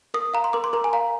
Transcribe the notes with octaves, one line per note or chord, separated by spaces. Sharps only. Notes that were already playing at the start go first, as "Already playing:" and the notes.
A#4 D#6
F5 A#5
C6
A#4 D6
C6
A#4 A#5
G#5
F5 A#5